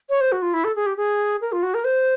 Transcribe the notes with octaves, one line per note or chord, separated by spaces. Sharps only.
C#5
C5
F#4
F4
E4
A4
G#4
G4
G#4
A#4
F4
F#4
A#4
C5